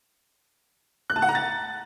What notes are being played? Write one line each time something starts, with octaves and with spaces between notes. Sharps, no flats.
F#6
A5
F#5
A#5
A6